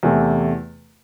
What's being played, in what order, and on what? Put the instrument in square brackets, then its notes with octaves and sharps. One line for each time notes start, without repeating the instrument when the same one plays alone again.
[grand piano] E2 C3 E3 A3